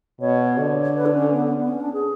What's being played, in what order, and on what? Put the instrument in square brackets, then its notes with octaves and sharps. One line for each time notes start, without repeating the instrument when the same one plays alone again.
[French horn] B2 [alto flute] C#5
[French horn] D3
[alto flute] B4
D4
C#4
B3
B3
C#4
D4
G#4